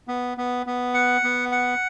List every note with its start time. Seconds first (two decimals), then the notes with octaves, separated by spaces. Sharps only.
0.08 B3
0.38 B3
0.66 B3
0.94 F#5
1.24 B3
1.52 F#5